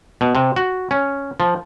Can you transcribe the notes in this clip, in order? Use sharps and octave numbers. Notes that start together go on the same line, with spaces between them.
B2
C3
F#4
C#4
F3